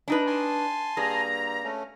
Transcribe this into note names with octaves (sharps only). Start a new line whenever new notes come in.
D4 D#4 B4
G#5 A5 C6
G2 A#3 G#4 A#5
A3 C#4